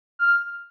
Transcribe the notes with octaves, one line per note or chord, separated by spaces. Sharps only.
F6